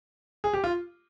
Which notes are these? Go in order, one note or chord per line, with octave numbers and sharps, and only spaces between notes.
G#4
G4
F4